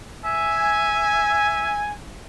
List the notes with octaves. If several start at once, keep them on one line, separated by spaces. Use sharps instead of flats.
E5 G#5